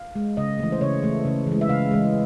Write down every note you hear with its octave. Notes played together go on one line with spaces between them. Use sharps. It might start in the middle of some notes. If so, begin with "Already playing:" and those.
Already playing: F5
G#3
C#3 D#5
E3 A3
C5
C#3 C#5
E3 A3
C#3
E3 G#3
E5
C#3 F5
E3 G#3